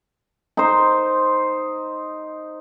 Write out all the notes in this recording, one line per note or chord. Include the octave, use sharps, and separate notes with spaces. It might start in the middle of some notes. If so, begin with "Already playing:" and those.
D#4 C5